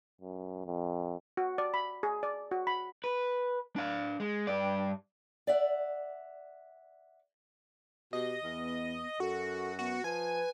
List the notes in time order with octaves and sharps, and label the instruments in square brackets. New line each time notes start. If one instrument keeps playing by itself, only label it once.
[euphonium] F#2
F2
[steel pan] F#4
D5
B5
G#4
D5
F#4
B5
[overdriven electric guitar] B4
D4 F5
G#3
G2 D5
[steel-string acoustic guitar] D5 E5 F#5
[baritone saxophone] B2 [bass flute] G4 [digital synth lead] D#5
[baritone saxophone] E2 [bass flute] B3
[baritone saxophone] F#2 [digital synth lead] F#4 [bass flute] A4
[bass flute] B3 [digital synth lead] F#4
[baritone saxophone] F3 [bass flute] B4 [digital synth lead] G#5